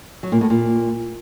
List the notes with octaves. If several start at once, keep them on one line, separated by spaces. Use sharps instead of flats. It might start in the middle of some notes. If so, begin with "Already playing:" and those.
F#3
A#2
A2
A#2